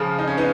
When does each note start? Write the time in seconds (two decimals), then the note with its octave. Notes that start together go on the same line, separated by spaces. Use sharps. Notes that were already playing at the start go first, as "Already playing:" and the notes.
Already playing: C#3 F3
0.19 D#4
0.28 C#4
0.37 B3 D#4